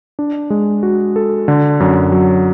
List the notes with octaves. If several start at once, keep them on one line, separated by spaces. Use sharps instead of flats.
D4
G#3
F#4
A4
D3
F#2
F#3